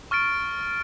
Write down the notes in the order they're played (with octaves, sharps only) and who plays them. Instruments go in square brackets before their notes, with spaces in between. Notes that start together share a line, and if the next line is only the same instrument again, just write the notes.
[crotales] C#6 F6 A6 D7